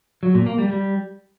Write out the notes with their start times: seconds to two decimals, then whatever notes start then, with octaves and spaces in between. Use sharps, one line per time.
0.23 F#3
0.35 A#2
0.46 A#3
0.58 G3
0.70 G3